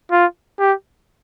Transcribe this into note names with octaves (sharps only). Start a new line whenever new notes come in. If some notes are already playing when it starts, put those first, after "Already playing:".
F4
G4